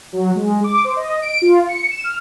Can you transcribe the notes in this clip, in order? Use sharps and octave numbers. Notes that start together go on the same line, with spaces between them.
F#3
G#3
D6
C5
D#5
D7
F4
C#7
E7
F6